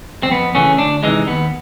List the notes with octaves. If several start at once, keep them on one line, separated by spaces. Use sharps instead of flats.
C4
F2 B3
C#3 E3 A3 C#4
D2 D4
C3 E3 G#3 D#4
D#2 B3